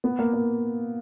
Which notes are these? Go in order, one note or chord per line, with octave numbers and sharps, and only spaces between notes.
B3
A#3
A#3